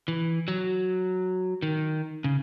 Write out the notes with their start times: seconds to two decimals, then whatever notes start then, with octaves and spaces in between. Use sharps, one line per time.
0.08 E3
0.48 F#3
1.62 D#3
2.24 C#3